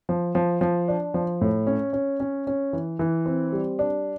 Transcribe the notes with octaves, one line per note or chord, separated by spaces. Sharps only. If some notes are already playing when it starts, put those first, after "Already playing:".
F3
F3
F3
D4
F3
A2
C#4
C#4
C#4
C#4
E3
E3
C4
G3
D4